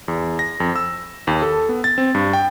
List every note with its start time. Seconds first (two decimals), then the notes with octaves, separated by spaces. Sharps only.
0.08 E2
0.39 A#6
0.60 F2
0.76 E6
1.27 D#2
1.42 A4
1.69 B3
1.84 A6
1.98 C4
2.15 G2
2.33 G5